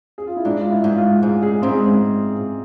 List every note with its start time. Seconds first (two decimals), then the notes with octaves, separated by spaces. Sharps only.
0.18 G#4
0.27 F4
0.36 E4
0.45 G#2 D4
0.61 F4
0.71 E4
0.84 G#2
0.97 F4
1.23 G#2 G#4
1.43 G#4
1.62 G#2 C4